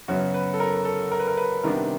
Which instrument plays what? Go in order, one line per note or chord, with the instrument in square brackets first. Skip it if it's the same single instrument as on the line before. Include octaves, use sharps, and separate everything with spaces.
[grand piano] F#2 C#3 F#3 B3 F#4
B4
A4
A#4
A4
A#4
B4
A#4
B4
C3 D#3 G3 B3 D4 A#4